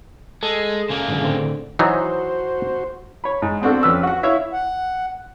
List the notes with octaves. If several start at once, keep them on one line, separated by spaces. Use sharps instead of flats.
G#3 A4
C#3 A#3
G#2 D3 F#3
A2 D3 C4
E3 F#3 D#4 F#4 C5
C#5 B5
G#2
B3 C4 D4 F#4 A4
F2 C#4 B4 E6
F#4 F#5
E4 C#5 E5 F5
F#5